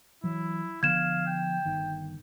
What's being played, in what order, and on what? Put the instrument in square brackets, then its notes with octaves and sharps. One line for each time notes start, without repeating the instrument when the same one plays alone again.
[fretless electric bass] E3 F#3 [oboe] E4
[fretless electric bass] D3 F3 B3 [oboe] F5 [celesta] G#6 E7
[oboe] G5
[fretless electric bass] G1 D#3